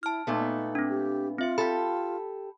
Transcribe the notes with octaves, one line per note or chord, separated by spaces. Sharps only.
E4 A5 F6
A#2 A3 B3 D#4
C4 D4
G4
C4 F4 E5 C#7
G4 A4 B5